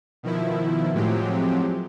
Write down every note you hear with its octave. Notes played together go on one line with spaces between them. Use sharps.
B2 D#3 F3 E4
A2 F3 F#3 G#3 C4 G4